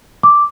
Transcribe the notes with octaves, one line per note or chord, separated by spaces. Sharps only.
D6